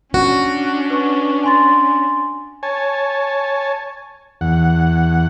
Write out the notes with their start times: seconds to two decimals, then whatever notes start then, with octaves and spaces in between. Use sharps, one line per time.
0.14 C#4 D4 F#4
0.90 B4 C#6
1.44 G#5 C6 A6
2.63 C#5 G#5 A5
4.41 E2 F#5